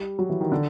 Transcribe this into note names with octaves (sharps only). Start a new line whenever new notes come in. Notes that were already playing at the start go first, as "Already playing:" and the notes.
Already playing: G3
F#3
E3
D#3
D3